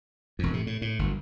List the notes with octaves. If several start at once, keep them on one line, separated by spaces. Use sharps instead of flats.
E1 F2
A2 C3
A2
A2
G1 F#2